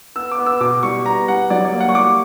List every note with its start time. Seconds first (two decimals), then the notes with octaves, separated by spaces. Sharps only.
0.16 B3 E6
0.32 D6
0.38 B3
0.46 E6
0.60 B2 D6
0.83 G3 C#6
1.06 B3 A#5
1.28 G3 F#5
1.50 F#3 D5
1.65 D5
1.73 A#3
1.80 F#5
1.89 C#6
1.94 G3 D6